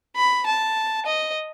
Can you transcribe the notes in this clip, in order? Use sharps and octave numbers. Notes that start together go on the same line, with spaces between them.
B5
A5
D#5